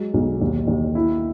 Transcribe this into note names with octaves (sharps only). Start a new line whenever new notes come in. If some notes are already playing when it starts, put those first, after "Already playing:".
Already playing: F#3 G#3
B1
D#2
D#2
E4